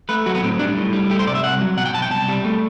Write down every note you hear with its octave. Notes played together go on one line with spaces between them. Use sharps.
A3 B4
F#3 F#4
B3
A2 C4
G3 D4
A2
G3
A3 G4
C5
C2 D5
E5
C2 F#5
F#3
B2 F#5
G5
B2 A5
G5
C2 A5
G3
A3